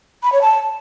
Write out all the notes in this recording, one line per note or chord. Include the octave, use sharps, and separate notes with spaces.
B5
C#5
A5